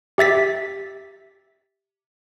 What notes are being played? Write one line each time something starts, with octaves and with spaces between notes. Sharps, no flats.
G4 E5 A6 B6